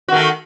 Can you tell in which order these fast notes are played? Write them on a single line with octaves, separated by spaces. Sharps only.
F#4 D#3 A3